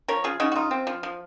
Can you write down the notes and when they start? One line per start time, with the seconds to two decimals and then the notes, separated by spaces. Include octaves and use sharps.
0.08 F3 A#4 C#5
0.24 C#3 F4 G#4
0.40 C#3 D#4 F#4
0.52 F#4
0.56 D#4 F4
0.71 C4
0.87 F3
1.03 F3